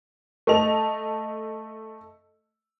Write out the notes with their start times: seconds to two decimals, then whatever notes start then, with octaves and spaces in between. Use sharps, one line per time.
0.47 A3 D#5 A5 F7